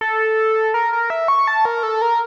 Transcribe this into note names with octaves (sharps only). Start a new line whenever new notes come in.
A4
A#4
A#4
E5
C#6
A5
A#4
A4
A#4